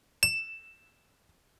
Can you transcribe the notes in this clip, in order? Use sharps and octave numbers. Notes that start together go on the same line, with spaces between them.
E7